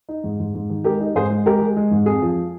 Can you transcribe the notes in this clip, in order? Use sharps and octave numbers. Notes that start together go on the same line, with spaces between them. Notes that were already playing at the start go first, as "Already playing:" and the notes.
D#4
G#2
G#2
G#2
D#3
G#3 G4 A#4
D#4
G#2 G#4 C5
G#3
G#3 G4 A#4
G#3
G#3
G#2
F2 G#4
F3